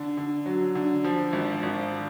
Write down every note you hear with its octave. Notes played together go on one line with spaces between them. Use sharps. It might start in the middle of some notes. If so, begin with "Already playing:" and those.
Already playing: D3
D3
F#3
D3
F3
G#1
G#1